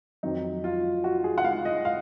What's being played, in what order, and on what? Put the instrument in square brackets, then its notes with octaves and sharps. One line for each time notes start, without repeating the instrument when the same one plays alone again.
[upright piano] F2 D#3 F#3 D#4
F4
F#4
G#4
F#5
F5
D#5
F5